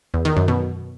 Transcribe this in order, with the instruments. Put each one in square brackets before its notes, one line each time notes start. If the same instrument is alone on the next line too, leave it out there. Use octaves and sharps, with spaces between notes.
[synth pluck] E2
D#3
F#2
B2